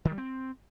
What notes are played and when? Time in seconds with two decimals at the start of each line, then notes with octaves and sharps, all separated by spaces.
0.05 D#3
0.11 G3
0.18 C4